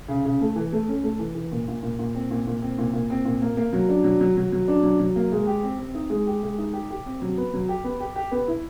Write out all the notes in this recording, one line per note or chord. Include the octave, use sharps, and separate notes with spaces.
C#3
C#3
A3
E3
A3
C#4
A3
E3
E3
A#2
A#2
A#2
A#2
C4
A#2
A#2
C4
A#2
A#2
C4
A#2
A#3
A#3
F#3
D4
F#3
F#3
F#3
F#3
D4
F#3
F#3
A#3
G#3
G4
C4
C4
D#4
G#3
G4
G#3
D#4
G4
G4
C4
F#3
B3
F#3
G4
B3
G4
G4
B3
E4